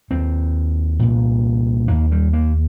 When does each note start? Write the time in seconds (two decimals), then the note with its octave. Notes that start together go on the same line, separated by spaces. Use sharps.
0.11 D#2 C4
0.99 C2 A#2
1.88 D#2 A#3
2.11 G3
2.33 A#3